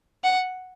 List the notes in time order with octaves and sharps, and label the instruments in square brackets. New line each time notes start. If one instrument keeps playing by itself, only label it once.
[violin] F#5